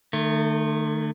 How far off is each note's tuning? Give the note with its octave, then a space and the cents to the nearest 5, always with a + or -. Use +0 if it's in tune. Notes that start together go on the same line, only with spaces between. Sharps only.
D#3 -35 A3 +15